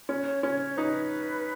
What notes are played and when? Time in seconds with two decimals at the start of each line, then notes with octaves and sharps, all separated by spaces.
0.09 C#4
0.26 C#5
0.43 C#4 C#5
0.60 C#5
0.77 D#4 B4